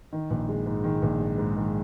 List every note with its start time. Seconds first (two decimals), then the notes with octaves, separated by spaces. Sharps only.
0.13 D#3
0.30 A#1
0.49 G#3
0.66 G#2
0.84 D#3
1.02 A#1
1.20 G#3
1.38 G#2
1.56 D#3